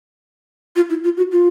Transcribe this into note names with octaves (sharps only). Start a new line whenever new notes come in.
F4
E4
F4
F#4
F4